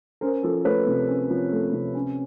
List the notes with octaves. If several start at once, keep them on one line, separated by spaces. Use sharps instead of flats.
C#4 A#4 C5
F3 A4
A3 B4 C#5
C3
C#4
F3
A3
C3
C#4